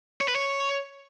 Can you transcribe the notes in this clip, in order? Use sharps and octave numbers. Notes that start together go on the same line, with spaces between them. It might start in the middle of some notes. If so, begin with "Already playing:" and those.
C#5
B4
C#5